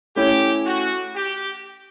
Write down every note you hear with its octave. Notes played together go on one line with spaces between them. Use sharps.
A3 C#4 E4 G4
F#4
G4